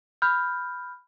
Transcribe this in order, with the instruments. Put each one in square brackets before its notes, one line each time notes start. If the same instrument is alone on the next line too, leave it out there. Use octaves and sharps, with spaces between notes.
[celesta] B5 F6 G6